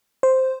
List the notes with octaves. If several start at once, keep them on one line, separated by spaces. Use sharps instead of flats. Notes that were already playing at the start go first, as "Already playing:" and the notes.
C5